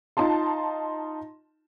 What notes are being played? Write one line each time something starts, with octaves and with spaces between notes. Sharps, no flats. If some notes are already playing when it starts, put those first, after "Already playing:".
D#4 F4 A5 C6